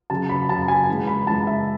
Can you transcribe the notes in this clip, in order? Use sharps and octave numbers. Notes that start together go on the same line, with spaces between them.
C#3 F#3 C#4 A5
B5
C#3 F#3 C#4 A5
G#5
C#3 E3 G#3
B5
C#3 E3 G#3 A5
E5